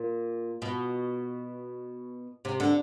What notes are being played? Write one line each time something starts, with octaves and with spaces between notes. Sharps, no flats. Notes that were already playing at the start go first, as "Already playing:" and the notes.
Already playing: A#2
B2
C3
D3